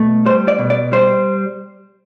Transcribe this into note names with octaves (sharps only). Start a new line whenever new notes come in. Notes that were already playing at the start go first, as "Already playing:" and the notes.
Already playing: B2 A3
G3 C5
D5
B2
D5
G3 C5